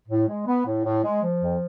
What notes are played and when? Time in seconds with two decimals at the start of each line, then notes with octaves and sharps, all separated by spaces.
0.09 A2
0.28 G#3
0.46 B3
0.66 A2
0.85 A2
1.04 G#3
1.23 F3
1.41 F2